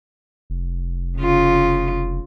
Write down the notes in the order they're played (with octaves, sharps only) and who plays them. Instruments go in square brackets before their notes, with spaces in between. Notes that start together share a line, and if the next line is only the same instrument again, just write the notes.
[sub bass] F1
[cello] C#3 F4